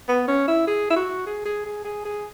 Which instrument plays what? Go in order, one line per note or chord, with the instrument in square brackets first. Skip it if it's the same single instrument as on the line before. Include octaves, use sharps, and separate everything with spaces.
[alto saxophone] B3
C#4
E4
G#4
E4
F#4
G#4
G#4
G#4
G#4
G#4